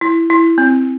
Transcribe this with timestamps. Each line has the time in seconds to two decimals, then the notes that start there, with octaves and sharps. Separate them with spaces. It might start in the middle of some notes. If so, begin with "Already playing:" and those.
0.01 E4
0.30 E4
0.58 C4